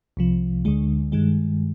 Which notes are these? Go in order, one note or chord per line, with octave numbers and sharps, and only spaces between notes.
C2 C3 F3
D2 D3 G#3
G2 D#3 G#3